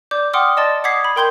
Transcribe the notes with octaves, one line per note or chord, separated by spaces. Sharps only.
D5 D6 G6
F#5 G5 C6 D6 D#6 F6
D5 D#5 A5 C6 A6
F#5 D6 D#6 G#6 B6 C7
B5
A#4 G5 C6 G6 G#6 G7